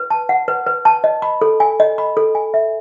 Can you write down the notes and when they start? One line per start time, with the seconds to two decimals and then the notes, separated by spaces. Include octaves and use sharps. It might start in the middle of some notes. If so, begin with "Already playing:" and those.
Already playing: B4
0.10 A5
0.29 F#5
0.48 B4
0.67 B4
0.85 A5
1.04 D#5
1.22 B5
1.41 A4
1.60 G#5
1.80 D#5
1.98 B5
2.17 A4
2.35 G#5
2.54 E5